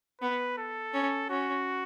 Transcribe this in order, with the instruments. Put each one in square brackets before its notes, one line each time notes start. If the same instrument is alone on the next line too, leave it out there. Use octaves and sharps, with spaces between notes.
[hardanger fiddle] B3 [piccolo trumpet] B4
[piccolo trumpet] A4
[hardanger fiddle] C#4
[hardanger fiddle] C#4 [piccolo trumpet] F#4